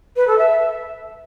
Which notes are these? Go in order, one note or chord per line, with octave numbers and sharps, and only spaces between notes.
B4
A4
E5